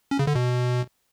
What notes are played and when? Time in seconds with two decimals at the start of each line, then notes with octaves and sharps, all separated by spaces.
0.11 C#4
0.19 C#3
0.27 D3
0.35 B2